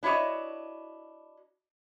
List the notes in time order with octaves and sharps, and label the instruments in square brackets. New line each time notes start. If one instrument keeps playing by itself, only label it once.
[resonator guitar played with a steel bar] D4 E4 F#4 C#5 D#5